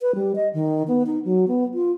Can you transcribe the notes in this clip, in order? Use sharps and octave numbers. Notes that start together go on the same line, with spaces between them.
B4
G3
D#5
D#3
B3
D#4
F#3
B3
F4